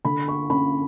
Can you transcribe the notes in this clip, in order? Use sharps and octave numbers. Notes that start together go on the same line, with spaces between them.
D3 B5
C#6
C#4 B5